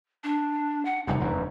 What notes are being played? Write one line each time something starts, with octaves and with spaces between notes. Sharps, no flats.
D4
F#5
F1 C2 G2 D#4
E1 F#2